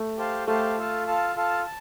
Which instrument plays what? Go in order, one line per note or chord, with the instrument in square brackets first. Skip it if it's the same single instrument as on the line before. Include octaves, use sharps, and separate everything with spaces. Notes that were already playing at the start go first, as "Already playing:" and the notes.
Already playing: [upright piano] A3
[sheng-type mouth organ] G4 C5 F5 A5
[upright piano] A3 [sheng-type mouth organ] G4 C5 F5 A5
[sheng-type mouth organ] F4 A4 F5 A5
F4 A4 F5 A5
F4 A4 F5 A5
A5